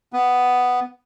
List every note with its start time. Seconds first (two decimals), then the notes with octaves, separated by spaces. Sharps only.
0.13 B3